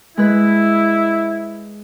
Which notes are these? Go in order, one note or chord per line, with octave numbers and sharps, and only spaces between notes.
G#3 E4 B4